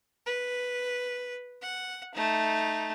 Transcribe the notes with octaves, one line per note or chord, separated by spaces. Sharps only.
B4
F#5
A3 D#4